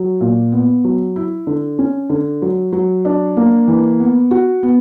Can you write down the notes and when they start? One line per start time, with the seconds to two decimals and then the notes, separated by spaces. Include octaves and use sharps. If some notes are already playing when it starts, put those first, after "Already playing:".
Already playing: F#3
0.21 A#2
0.52 B3
0.84 F#3
1.16 E4
1.47 D3
1.79 C#4
2.10 D3
2.42 F#3
2.72 F#3
3.05 D4
3.37 A#3
3.68 E3
4.00 B3
4.31 F#4
4.63 B3